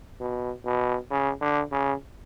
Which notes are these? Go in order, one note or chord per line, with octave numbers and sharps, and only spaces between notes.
B2
B2
C#3
D3
C#3